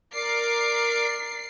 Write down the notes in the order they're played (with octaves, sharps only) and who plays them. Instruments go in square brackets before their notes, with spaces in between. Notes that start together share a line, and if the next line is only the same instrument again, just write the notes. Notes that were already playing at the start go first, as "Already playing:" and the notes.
[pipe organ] A#4 D5 D6 [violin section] C7